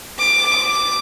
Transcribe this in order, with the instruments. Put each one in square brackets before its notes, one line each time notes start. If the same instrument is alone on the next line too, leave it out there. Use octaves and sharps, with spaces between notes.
[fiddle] D6